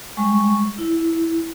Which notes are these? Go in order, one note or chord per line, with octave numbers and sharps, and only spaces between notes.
G3 G#3 C#6
E4